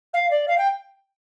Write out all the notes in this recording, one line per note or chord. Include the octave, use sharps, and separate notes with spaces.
F5
D5
F5
G5